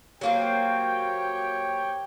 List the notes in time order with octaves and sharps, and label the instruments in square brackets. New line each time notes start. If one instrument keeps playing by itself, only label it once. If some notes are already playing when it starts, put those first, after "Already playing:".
[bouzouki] F#3 A#3 C4 [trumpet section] G4 C#5 G5